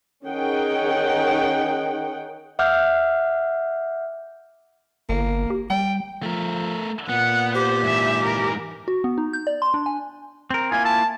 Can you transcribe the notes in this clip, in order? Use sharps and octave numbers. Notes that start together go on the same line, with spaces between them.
D#3 C#4 D#4 G#4 F#5 G5
E5 F#5 D6 F6 G6
G1 A#3
G4
G3 G5
F3 A3 A#4
A#2 B3 F#5
G4 C5
G#2 E3 E5
A#4
F#4
B3
D#4
G6
D5
C6
D4
G#5
C4 A#4
A#3 E4 F4 G#5
A5